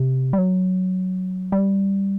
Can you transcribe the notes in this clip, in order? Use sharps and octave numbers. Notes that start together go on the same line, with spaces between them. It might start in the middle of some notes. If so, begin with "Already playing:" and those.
Already playing: C3
G3
F#3
G3